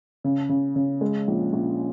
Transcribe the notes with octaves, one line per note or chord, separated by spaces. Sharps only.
C#3
C#3
C#3
G#3
A#1
A#1